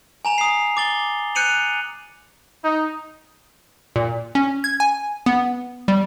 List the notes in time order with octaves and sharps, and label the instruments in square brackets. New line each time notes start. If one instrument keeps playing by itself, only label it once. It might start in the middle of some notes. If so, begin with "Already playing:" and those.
[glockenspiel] G#5 A#5 F7
D#6 C7
D6 A6 G7
F#6 G6 C#7 D#7 F7 F#7
[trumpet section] D#4
[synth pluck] A#2
C#4
G#6
G#5
B3
G3